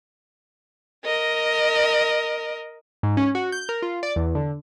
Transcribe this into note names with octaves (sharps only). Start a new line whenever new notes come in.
A#4 D#5
G#2
C#4
F#4
G6
A#4
F4
D5
E2
D3